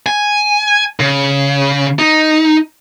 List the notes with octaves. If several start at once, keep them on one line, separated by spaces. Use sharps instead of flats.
G#5
C#3
D#4